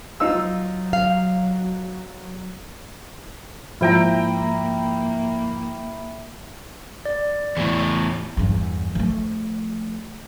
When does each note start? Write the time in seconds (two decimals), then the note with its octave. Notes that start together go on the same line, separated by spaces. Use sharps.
0.20 F#3 D#4 F4 E6
0.93 F5
3.81 G#2 F3 A#3 E4 G5 A#5
7.05 D5
7.57 E2 A2
8.37 E2 G2
8.95 F3 A3